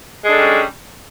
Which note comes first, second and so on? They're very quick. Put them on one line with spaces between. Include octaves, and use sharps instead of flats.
G#3 D4 A4 G3 C#4